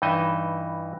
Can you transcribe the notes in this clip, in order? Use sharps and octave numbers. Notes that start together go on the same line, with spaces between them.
G2 E3 D#4 D#5 E5